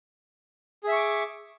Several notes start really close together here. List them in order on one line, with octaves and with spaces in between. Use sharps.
G#4 E5 C#6 D6